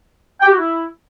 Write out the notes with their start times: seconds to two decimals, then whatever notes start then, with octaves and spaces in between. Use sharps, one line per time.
0.41 G5
0.47 G4
0.52 F#4
0.58 E4